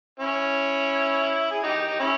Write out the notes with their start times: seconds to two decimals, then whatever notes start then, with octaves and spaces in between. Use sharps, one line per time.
0.19 C#4 E4
1.51 G#4
1.63 D#4 G4
1.88 D#4
1.99 C#4 E4